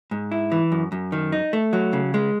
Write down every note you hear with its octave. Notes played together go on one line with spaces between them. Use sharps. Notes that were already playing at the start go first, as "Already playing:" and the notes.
G#2
E4
E3
F#2
F#2
D#3
D#4
A3
F#3
C#3
G#3